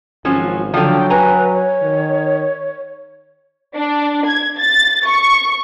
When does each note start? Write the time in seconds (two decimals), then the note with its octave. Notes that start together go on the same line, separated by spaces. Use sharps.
0.25 G#1 F3 F#3 C#4
0.74 D3 F3 F#3 G5
1.10 B4 G#5 A#5
1.54 C#5
1.82 D#3
3.75 D4
4.26 G#6
4.58 A6
5.06 C#6